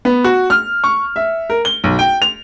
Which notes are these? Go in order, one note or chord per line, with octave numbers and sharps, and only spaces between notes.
B3
F#4
F6
C#6
E5
A#4
G7
B1
G5
F7